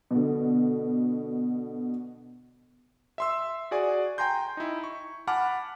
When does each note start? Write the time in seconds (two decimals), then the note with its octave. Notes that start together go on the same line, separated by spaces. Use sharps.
0.11 B2 D3
3.18 E5 C6 E6
3.71 F#4 G#4 D5 G#5
4.18 G5 G#5 A#5 C6 G6
4.57 D#4 E4
4.84 C#6
5.27 F#5 G#5 A5 B5 D6 F6